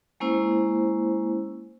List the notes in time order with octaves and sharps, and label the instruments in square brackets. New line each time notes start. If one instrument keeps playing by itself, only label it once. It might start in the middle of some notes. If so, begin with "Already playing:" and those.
[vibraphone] G#3 A#3 C#4 E4 C5